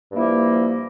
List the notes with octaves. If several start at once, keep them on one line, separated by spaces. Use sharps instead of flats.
G2 F3 A#3 E4